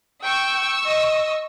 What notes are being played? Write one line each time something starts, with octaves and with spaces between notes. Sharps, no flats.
G5 C#6 E6
D#5